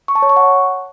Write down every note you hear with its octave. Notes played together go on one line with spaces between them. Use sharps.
C#6
A5
C#5
C#6
F#5